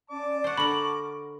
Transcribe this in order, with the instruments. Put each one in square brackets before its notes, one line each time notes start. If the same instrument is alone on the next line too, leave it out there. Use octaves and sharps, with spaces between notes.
[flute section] C#4 D5 [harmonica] A5 D6
[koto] C5 F#5 [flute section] C#6
[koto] D3 A#4 [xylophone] B5 F#7